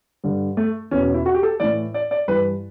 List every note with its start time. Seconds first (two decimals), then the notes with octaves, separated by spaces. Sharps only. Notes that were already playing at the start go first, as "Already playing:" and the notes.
0.24 G2 D3
0.57 A3
0.91 E2 B2 C#4
1.03 C#4
1.14 E4
1.26 F#4
1.34 G4
1.43 A4
1.60 A2 E3 D5
1.94 D5
2.11 D5
2.28 G2 E3 B4